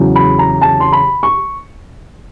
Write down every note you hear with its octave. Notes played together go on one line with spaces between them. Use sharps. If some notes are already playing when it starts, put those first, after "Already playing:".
Already playing: E2 C#3 F#3
B5
A#5
A5
C6
B5
C#6